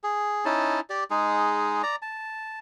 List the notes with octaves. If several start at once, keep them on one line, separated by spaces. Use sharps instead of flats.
G#4
C#4 D#4 E4 A5
G4 D5
G#3 D#4 G#4
D5 A#5
A5